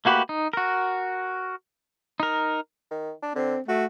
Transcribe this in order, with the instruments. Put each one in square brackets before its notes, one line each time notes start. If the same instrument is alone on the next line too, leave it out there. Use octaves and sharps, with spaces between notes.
[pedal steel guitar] A3 A#3 F#4 G4 B4
D#4
F#4 A#4
D#4 A#4
[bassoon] D#3
D4
[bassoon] D3 [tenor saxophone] C4
[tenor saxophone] A3 [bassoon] F#4